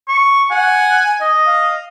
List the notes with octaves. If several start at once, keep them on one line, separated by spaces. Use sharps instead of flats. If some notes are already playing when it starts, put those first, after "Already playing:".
C#6
F#5 G#5
D#5
F5